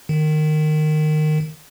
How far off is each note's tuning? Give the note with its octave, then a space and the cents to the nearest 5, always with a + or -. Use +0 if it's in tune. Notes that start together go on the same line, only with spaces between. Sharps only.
D#3 -20